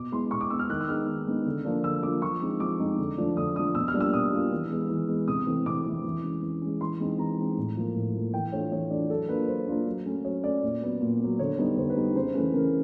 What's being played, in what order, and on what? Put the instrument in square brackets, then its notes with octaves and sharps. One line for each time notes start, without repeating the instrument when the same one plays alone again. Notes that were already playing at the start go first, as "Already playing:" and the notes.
Already playing: [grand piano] B2 D6
G#3 B3 E4 C6
B2 C#6
D6
G#3 B3 E4 E6
F6
D#3 F#6
E6
G#3 B3 D#4 F6
D#3
G#3 B3 D#4
D3
F3 A#3 D4 F4
D3 E6
F3 A#3 D4 F4 D6
F3 C#6
G#3 C4 D#4
F3 D6
G#3 C4 D#4
D3
F3 A3 D4
D3 D#6
F3 A3 D4 D#6
B2 E6
F6
G3 A#3 D4 F4
E6
B2 D#6
G3 A#3 D4 F4
E3
G#3 B3
E3
G#3 B3
C3 D#6
E3 A3 C4 E4
C3 D6
E3 A3 C4 E4
E3
G#3 C#4
E3
G#3 C#4
E3 C6
G#3 C4 D#4
E3 A#5
G#3 C4 D#4
A2
F3 A#3
A2
F3 A#3
E3 G5
A3 D4 F4 C#5
E3 C#5
A3 D4 F4 D5
F#3 A4
A#3 D4 F4 B4
F#3 C5
A#3 D4 F4
F#3
A3 C#4
F#3 C#5
A3 C#4 D5
A#2
F#3 B3
A#2
F#3 B3
D3 C#5
G3 B3 D#4
D3 C5
B4
G3 B3 D#4
C#3 C5
E3 A3 C#4 B4
C#3 A#4